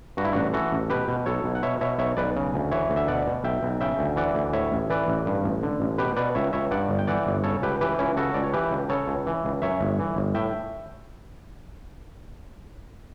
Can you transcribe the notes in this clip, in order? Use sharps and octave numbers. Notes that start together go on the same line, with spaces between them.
G2 F#4
E4
A1 D4 F#4
E3 F#4 A4
A1
B2 G4 B4
B2
B1 A4 C#5
B1
F#5
B2 C#5 E5
B2 C#5 E5
B1 C#5 E5
B1 B4 D5
C#3
D2
E3 C#5 E5
D2
E5
B2 D5 F#5
B2
B1 E5 G5
B1
C#3 E5 G5
D2
E3 D5 F#5
D2
A2 C#5 E5
A1
E3 B4 D5
A1
G2
A1
D3
A1
B2 G4 B4
B2 B4 D5
C#2 C#5 E5
C#2 C#5 E5
G2 D5 F#5
G1
G5
E3 D5 F#5
G1
C#3 A4 C#5
C#2 G4 B4
E3 G4 B4
C#2 C#4 E4
C#3 F#4 A4
C#2 D5
C#5
E3 G4 B4
C#2
C#3 A4 C#5
C#2
E3
C#2
F#2 C#5 E5
G1
E3
G1
A2 E5 G5